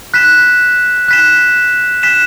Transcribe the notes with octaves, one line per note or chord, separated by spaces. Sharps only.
F#6 B6 E7
F#6 B6 E7
F#6 B6 E7